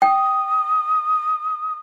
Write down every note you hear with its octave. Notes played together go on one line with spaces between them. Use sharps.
G5 D#6